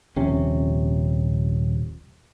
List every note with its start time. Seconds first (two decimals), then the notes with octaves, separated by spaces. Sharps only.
0.16 D#1 A#1 C3 C#4